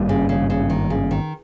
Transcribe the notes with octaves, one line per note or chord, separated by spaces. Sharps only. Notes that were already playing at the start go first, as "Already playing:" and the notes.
Already playing: G#1 G2 G3 A#3
C#3
C#3
C#3
D#3
C#3
D#3